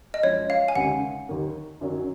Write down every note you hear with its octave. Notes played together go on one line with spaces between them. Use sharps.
D#5
F#2 F3 G#3 C#5
F5
G#5
D#2 C#3 G#3 D#4 F#5
D#2 D#3 A#3 D#4
F#2 D#3 F#3 C#4